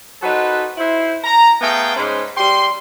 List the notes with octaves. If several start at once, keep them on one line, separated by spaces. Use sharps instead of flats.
D#4 F#4 A4 B4 C5
E4 C5
A#5
A3 B3 G#4 F5 G5
G#2 C#4 G#4 B4 C5
G3 G5 C6